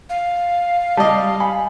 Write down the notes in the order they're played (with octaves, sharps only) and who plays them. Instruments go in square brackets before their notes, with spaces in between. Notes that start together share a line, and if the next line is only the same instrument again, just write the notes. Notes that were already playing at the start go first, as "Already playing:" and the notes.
[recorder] F5
[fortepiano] G3 D5 D#5 [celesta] A5
[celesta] G#5 [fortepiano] B5